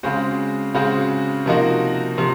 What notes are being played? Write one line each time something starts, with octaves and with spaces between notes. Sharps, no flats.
C#3 G#3 C4 F#4
C#3 G#3 C4 F#4
C3 F3 A#3 D#4 F#4
C3 F3